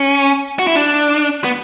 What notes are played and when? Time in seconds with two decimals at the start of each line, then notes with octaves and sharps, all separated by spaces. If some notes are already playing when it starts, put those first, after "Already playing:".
Already playing: C#4
0.59 F#4
0.67 E4
0.75 D4
1.45 B3